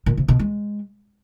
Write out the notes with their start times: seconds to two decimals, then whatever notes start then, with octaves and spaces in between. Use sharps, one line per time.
0.06 A#2
0.17 C3
0.28 B2
0.39 G#3